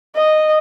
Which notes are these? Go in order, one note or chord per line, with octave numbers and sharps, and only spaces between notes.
D#5